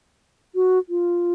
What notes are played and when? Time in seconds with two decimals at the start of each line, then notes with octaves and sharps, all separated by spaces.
0.55 F#4
0.89 F4